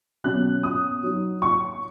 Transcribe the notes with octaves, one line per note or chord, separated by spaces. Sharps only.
B2 F#3 C#4 F#6
D#6
F#3 D#4
C#6